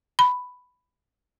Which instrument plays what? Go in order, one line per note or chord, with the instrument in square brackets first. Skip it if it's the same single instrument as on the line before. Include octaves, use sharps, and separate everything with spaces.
[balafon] B5